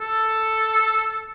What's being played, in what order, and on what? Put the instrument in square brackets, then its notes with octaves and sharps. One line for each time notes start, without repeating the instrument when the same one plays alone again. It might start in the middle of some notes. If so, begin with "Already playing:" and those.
[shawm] A4